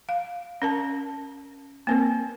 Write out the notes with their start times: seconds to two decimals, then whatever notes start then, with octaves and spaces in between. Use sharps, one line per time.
0.09 F5
0.62 C#4 A#4 A5
1.87 A#3 C4 A#4